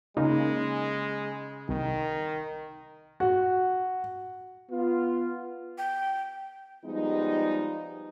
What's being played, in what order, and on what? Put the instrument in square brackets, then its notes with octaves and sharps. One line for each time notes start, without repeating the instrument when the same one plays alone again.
[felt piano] C#3 [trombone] G#3 [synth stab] A#3 D#4
[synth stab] C2 [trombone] D#3
[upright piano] F#4
[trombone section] B3 F4
[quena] G5
[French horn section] F3 G3 G#3 B3 D#4